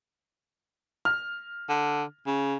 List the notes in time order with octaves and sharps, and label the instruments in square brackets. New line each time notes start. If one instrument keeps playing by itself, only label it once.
[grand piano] F6
[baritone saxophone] D3
C#3